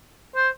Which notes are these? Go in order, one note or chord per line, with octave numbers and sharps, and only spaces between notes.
C5